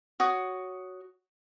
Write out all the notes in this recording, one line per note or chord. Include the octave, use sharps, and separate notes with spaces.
F#4 C#5 D#6